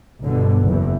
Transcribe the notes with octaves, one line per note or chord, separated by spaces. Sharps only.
G1 B2 D3
F#1 E2 E3